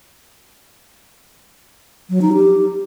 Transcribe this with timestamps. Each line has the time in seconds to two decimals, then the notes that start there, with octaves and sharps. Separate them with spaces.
2.10 F#3
2.21 D#4
2.33 G4